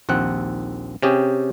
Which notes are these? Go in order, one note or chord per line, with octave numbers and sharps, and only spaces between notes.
A#1 D#2 C4 F#5
C3 C#4 G4 G#4